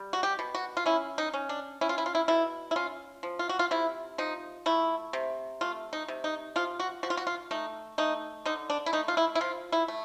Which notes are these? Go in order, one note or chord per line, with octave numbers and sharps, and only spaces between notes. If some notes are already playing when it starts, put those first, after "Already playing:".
Already playing: G3
F#4
G4
B2
F#4
F4
C#4 E4
D#4
C#4
D4
C#4 E4
F4
E4
F4
E4
B2 E4
E4
C#4 F4
F3
F4
F#4
F4
C3 E4
F3 D#4
A3 E4
C3
A3 F4
D#4
C3
D#4
F3 F4
F#4
F3 F#4
F4
F#4
F4
A3 D#4
A3 D#4
D3 D#4
D4
E4
A3 D#4
F4
E4
E4
F3 F4
E4
A3